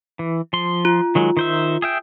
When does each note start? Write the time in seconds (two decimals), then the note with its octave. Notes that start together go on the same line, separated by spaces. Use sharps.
0.19 E3
0.53 F3 C6
0.85 F4
1.15 D#3 F#3 G#3
1.37 D#3 C5 E5
1.82 G#4 E5 G5